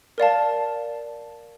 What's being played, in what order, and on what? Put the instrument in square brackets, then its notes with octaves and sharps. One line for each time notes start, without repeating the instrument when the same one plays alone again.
[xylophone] A#4 D5 F5 A5